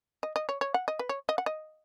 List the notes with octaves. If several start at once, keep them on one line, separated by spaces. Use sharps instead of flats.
D#5
D#5
C#5
C#5
F#5
D#5
B4
C#5
D#5
F#5
D#5